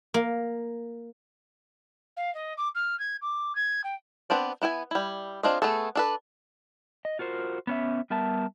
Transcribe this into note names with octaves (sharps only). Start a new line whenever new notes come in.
A#3
F5
D#5
D6
F6
G#6
D6
G#6
G5
B3 C4 D4 D5
B3 E4 G5 G#5
G3 E4
C4 D4 F4 G#4 D#5
A3 B3 G#4 A4
D4 A4 B4
D#5
F4 F#4 A#4 C5
B3 C#4 E5
G3 B3 A#4 E5 A5